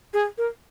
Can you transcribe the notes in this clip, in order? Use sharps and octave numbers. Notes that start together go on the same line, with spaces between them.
G#4
A#4